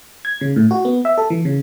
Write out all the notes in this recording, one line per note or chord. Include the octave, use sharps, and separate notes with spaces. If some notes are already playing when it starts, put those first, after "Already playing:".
G#6
C#3
A2
F#4
B3
E5
A4
E3
C#3